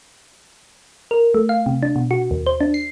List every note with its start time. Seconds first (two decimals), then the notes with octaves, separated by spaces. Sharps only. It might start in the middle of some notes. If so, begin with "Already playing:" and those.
1.11 A#4
1.34 A3
1.49 F5
1.66 C3
1.83 D4
1.96 B2
2.11 F#4
2.31 D#2
2.46 C5
2.61 D4
2.74 C7